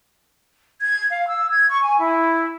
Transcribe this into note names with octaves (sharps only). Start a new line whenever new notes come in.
G#6
F5
E6
G#6
C#6
G#5
E4